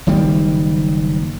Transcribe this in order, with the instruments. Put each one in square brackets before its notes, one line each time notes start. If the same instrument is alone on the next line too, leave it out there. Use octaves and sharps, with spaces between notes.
[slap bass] F#1 D#3 G3 A#3